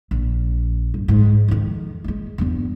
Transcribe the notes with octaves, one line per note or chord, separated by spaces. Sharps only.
A#1
G2
G#2
F2 D#3
G3 G#3
E2 G2